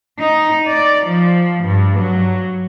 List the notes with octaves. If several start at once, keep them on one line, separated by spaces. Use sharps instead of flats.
D#4
D5
F3
G2
F#3